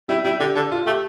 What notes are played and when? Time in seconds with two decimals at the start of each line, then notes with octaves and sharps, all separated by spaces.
0.09 G3 E4
0.24 G3 E4
0.40 D3 G4
0.55 D3 A4
0.72 F4
0.86 A3 G4